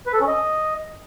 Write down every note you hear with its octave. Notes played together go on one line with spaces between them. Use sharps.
B4
A4
C#4
D#5